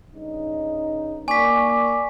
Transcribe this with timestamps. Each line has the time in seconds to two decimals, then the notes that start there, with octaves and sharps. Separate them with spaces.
0.15 G2 C#3 D#4
1.28 A#3 D5 G#5 C#6 D6 B6